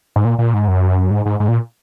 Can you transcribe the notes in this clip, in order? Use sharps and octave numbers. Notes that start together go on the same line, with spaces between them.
G#2
A#2
A#2
G#2
F#2
G#2
G#2
G#2
A#2